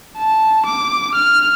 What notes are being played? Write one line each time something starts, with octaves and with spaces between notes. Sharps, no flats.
A5
D6
F6